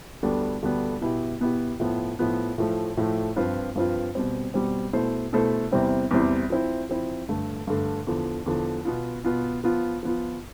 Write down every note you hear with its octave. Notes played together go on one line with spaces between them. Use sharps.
D2 D3 G3 B3 D4
D2 D3 G3 B3 D4
B2 B3 E4 G4
B2 B3 E4 G4
A2 F3 B3
A2 F3 B3
A2 F3 A3
A2 F3 A3
G2 F3 C4 F4 B4
G2 F3 C4 F4 B4
B2 G3 C4
B2 G3 C4
B2 A3 E4 A4 C5
B2 A3 E4 A4 C5
E2 C3 G3 C4 E4
E2 C3 G3 C4 E4
F3 C4 E4
F3 C4 E4
G2 D3 A3
G2 D3 A3
E2 D3 F3
E2 D3 F3
B2 B3 F4
B2 B3 F4
F3 B3 F4
F3 B3 F4